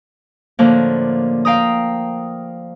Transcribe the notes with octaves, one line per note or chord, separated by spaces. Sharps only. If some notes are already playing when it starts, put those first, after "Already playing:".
A2 D3 F3 A#3
F5 G5 A#5 D#6